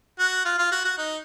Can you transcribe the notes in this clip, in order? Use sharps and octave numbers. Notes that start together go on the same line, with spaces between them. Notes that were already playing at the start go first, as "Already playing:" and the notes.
F#4
F4
F4
F#4
F#4
D#4